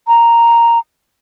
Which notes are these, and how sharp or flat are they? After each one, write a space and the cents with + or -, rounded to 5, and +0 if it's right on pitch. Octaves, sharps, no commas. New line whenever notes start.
A#5 -5